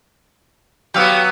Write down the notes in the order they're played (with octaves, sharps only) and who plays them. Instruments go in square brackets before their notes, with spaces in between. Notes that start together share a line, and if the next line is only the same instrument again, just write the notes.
[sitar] F#3 B3 [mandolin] G4 F5 E6